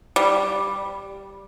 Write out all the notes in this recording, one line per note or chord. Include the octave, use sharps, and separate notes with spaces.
G3